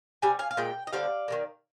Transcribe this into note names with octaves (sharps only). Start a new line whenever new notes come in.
C3 G3 G#5
F5 G#5
F5
A#2 G#3 G5
D#5
D3 G3 C4 D5 F5
D#3 G3 A#3